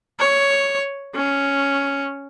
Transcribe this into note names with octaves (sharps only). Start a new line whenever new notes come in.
C#5
C#4